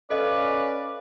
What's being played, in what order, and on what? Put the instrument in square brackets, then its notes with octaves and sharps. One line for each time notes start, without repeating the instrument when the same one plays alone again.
[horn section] C#4 B4 F5 [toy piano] A4 D#5 [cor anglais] D5